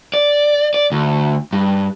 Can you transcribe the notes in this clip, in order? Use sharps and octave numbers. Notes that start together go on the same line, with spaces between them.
D5
D5
D2
G2